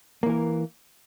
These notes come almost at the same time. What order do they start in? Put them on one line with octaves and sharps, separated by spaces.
A#3 E3 A#4